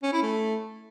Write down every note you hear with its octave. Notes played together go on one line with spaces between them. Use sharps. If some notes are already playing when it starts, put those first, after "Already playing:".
C#4
E4
A3